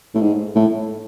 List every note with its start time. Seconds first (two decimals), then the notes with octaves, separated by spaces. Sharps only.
0.15 A2
0.21 G#2
0.56 A2